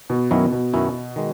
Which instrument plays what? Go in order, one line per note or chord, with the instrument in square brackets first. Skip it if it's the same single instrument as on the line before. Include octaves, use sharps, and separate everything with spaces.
[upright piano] B2
[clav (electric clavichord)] F#2 D#3 F#3 C#4 E4 [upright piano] B2
[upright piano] B2
[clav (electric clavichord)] F#2 D#3 F#3 C#4 E4
D#3 G#3